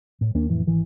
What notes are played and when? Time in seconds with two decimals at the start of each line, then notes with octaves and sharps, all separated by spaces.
0.21 A2
0.35 D#2 A#3 D4
0.49 F2 A2 E3
0.67 G#1 E3